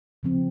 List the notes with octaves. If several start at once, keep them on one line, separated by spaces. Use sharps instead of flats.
C#3 F3 C4